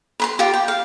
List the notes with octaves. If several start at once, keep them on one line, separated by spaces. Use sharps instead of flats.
B4 B5 C6
F4 G4
G5
F5